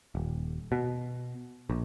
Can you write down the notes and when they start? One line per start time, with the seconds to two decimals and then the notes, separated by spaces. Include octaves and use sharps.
0.15 D#1
0.72 B2
1.70 A#1